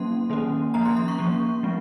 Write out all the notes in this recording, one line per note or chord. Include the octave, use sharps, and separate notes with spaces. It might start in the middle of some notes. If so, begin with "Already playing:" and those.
Already playing: F#3 A#3 C#4 C6
D#3 A#3 C#4
F3 A#3 C#4 A#5
C6
C6
C#6
F3 A#3 C#4
F3 G#3 C4